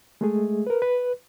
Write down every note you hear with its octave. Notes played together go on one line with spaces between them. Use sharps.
G#3 A3 G#4
A#4 B4
B4